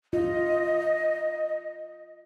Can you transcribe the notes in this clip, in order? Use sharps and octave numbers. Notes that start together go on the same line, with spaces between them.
F4 D#5